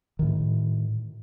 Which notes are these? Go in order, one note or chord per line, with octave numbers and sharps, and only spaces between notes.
A2 D#3